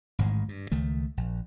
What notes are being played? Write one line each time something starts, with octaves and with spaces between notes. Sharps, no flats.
A1 G#2 D#3 G#3
G2
C#2 D#3 A3
A#1